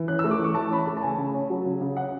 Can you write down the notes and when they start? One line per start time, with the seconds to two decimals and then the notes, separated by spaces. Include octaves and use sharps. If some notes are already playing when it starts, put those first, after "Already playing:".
Already playing: E3
0.08 C#4 F#6
0.19 E6
0.24 A3
0.31 D6
0.39 E3 C#6
0.55 E3 A5
0.71 C#4 B5
0.78 A5
0.87 A3
0.97 A5
1.02 C#3 G#5
1.18 C#3
1.34 C#4
1.50 F#3
1.65 C#3
1.81 C#3
1.97 C#4 F#5